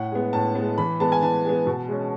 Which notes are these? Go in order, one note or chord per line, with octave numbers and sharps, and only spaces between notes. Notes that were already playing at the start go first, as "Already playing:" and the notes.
Already playing: A2 F#5
G#3 B3
A2 A5
B3
G#3
E3 B5
G#3 B3 A5
G#5
E3 A5
G#3 B3
B2
G#3 C#4